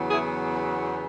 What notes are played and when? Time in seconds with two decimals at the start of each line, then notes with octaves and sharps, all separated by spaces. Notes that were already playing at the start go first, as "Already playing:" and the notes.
Already playing: E2 C#3 F#3 B3
0.11 E4 G#4